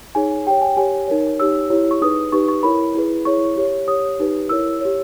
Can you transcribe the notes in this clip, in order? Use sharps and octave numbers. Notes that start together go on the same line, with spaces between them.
D#4 G#4 C#5 G#5
G4 C#5 G5
G#5
G4 C#5 G#5
D#4 A#4 C#5
D#4 G4 C#5 E6
E4 G4 C#5
C#6
D#4 G#4 B4 D#6
D#4 G4 B4 C#6
C#6
E4 A#4 C#5 B5
E4 G#4 B4
E4 G#4 C#5 C#6
G4 C#5
G4 C#5 D#6
D#4 G4 B4
E4 A#4 C#5 E6
G4 C#5